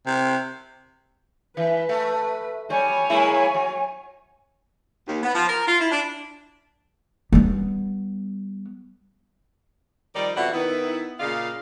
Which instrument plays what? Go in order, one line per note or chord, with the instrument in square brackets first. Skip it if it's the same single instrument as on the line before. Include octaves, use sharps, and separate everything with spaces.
[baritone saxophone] C3
[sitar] E3 [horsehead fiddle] B4
[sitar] A3
[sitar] G3 [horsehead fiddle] C#5 G#5
[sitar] G#3 A#3 E4
F#3
[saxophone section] D#2
B3
F3
A#4
F4
E4
D4
[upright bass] G3 B3
[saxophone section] D#3 F3 G3 D#4 D5
F2 B2 E3 G3 F#4 F#5
D#3 B3 E4
A#2 C#3 D5 D#5 F5